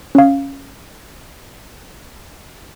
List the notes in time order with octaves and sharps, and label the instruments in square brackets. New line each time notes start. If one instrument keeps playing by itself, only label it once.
[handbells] C#4 F5